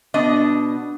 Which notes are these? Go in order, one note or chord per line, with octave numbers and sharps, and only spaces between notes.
B2 B3 D4 D#5